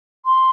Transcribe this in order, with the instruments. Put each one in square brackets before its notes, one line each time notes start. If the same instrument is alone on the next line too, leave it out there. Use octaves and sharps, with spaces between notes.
[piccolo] C6